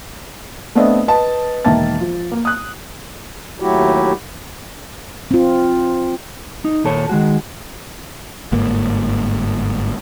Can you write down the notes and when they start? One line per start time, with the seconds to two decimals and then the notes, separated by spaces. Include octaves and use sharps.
0.75 A3 B3 C4 D4 D#5 E5
1.08 B4 D#5 A5
1.65 E1 D#3 A#3 E5 A5 A6
2.01 F3
2.32 A#3
2.45 D#6 F#6
3.60 D#2 F#3 A3 E4 F#4 G4
5.31 C4 F4
6.65 D#4
6.84 D#2 A#2 A4 C#5
7.09 D#3 G#3 F#4
8.52 G1 G#2 A#3